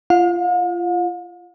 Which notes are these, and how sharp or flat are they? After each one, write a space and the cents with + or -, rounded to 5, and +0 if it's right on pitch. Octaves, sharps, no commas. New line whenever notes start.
F4 -25 F5 +45